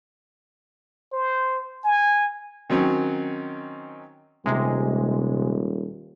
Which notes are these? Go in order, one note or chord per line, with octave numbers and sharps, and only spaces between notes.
C5
G#5
D#3 F#3 C4 C#4
D#1 C3 G#3